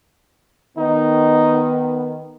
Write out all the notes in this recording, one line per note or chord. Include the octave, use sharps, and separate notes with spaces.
D#3 B3 D#4